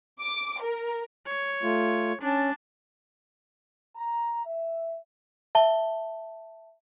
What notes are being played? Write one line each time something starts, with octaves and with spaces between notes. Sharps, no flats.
D6
A#4
C#5
A3 F4
C#4 D4 A5
A#5
E5
E5 A5 G7